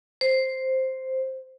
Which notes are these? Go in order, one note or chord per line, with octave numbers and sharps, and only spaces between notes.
C5